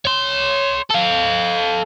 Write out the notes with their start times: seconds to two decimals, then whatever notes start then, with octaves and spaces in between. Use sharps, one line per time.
0.05 C#5 C6
0.90 A4 F5